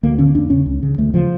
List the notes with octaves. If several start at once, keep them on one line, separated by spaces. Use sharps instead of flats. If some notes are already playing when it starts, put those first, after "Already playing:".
D2 A#3
D3 C#4
E2 D4
C#3 C#4
C#2
C#3
D2 A3
C#3 F3